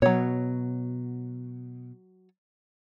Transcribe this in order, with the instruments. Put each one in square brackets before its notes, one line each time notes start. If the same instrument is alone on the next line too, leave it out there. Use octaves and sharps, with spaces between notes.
[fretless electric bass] B2 [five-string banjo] F#3 C#5